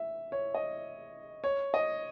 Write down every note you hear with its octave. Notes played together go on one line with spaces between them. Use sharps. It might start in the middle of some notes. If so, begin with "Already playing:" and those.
Already playing: E5
C#5
D#5
C#5
D#5